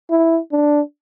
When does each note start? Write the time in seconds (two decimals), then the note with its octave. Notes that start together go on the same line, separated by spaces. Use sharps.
0.10 E4
0.52 D4